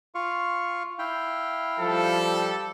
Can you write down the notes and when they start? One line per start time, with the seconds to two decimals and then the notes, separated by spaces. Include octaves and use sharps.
0.15 F4 F5 C#6
0.99 E4 F5 G5
1.80 F3 G3 A4